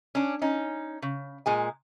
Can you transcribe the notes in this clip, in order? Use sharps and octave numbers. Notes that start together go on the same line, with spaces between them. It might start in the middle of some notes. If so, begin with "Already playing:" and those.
C#4 D4
C#4 D#4
C#3
A#2 G#3 G#5